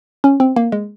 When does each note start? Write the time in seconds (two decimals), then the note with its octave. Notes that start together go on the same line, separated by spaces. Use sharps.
0.24 C#4
0.40 C4
0.56 A#3
0.72 G#3